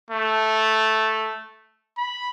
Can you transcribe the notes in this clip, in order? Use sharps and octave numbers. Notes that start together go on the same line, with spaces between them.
A3
B5